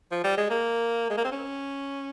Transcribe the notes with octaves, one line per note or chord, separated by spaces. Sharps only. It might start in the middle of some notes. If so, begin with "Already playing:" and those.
F3
G3
G#3
A#3
G#3
A#3
C4
C#4